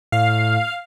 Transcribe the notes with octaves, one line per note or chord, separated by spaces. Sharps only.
A2 F5